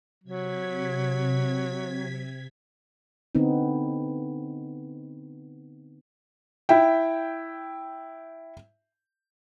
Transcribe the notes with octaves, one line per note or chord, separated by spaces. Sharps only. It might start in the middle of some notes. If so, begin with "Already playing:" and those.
C3 F#3 G#6 B6
D3 B3 C4 D#4
E4 E5 G5